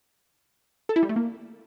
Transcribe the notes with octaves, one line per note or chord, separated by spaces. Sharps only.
A4
E4
G3
A3
A#3